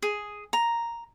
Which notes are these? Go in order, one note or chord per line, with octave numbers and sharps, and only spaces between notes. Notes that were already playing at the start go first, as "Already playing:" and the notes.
G#4
A#5